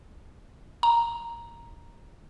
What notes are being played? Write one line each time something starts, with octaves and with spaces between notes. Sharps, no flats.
A#5